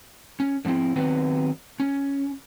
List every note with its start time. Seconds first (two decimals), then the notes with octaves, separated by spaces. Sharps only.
0.40 C#4
0.65 D3 F3 B3 C4 E4
0.96 D#3 F#3 B3 C4 B4
1.80 C#4